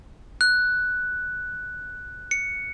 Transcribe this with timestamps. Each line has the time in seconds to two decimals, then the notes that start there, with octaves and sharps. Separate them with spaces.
0.41 F#6
2.31 C#7